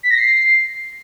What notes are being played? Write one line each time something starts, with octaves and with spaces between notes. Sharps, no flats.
B6
A#6
C7